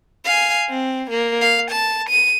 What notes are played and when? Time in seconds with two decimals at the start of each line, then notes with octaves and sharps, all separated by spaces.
0.25 F5 G#5
0.70 C4
1.10 A#3
1.41 F5
1.70 A5
2.09 D#7